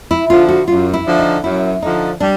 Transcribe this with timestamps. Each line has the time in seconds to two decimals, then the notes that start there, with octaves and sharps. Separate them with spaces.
0.11 E4
0.30 D3 F3 F4
0.49 F#4
0.67 F#2 F4
0.94 E4
1.06 D3 F3
1.19 D#4
1.44 F#2 E4
1.82 D3 F3 D#4
2.20 G3 D4